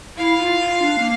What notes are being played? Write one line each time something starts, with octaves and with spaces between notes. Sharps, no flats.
E4 F5
F4
F4
D4
A#3